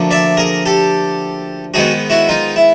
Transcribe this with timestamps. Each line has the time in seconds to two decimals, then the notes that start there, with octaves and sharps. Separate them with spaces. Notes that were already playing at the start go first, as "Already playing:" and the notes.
Already playing: D2 D3 F3 A#3 D4
0.11 D5 E5
0.37 G#4 A#4
0.66 G4 A4
1.74 G#2 D#3 G#3 B3 F#4 G#4
2.10 E4 F#4
2.29 D#4 F4
2.56 E4